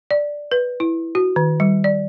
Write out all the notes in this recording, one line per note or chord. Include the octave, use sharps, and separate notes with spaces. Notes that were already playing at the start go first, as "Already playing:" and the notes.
D5
B4
E4
F#4
D#3
G3
D5